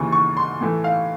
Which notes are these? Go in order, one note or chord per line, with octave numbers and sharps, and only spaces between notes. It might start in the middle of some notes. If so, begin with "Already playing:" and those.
Already playing: D#2 C#3 E3 C#6
C#6
C6
A2 E3 A3
F5